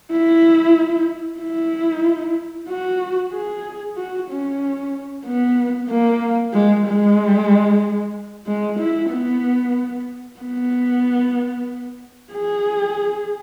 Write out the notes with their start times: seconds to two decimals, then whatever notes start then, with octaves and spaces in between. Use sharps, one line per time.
0.12 E4
1.40 E4
2.69 F#4
3.33 G#4
3.97 F#4
4.30 C#4
5.26 B3
5.89 A#3
6.54 G#3
6.86 G#3
8.47 G#3
8.79 E4
9.11 B3
10.40 B3
12.33 G#4